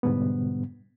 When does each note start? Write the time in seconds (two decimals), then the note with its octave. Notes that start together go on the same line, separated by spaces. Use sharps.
0.03 G#2 B2 D3 G3 B3